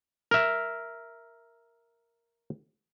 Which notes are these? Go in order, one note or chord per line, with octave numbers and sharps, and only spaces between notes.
A#4 E5